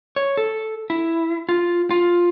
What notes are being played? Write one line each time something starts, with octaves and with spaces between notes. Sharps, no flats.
C#5
A4
E4
F4
F4